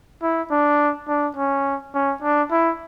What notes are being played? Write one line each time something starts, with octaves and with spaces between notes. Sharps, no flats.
E4
D4
D4
C#4
C#4
D4
E4